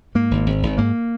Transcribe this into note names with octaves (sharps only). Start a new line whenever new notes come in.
G#2 A#3
G#1
G#1
G#1
G#2 A#3